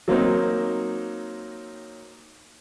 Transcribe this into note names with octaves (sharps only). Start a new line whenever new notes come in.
F#3 A#3 C4 D#4